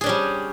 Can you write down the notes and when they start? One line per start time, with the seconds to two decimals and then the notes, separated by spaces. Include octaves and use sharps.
0.01 G#4
0.04 D4
0.06 C#4
0.09 G3